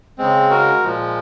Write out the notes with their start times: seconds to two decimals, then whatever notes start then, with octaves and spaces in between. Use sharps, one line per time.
0.18 C#3 G#3 C4
0.50 F#4 A#4
0.83 A#2 F3 G#3